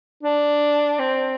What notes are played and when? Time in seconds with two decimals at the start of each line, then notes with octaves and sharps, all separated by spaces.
0.23 D4
0.99 C4